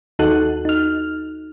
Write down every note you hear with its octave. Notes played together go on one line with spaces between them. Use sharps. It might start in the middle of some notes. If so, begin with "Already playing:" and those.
D#2 D#4 F#4 A4 F#6
D#4 F6